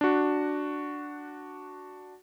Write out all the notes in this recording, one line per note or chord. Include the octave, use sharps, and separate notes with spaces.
D4 F#4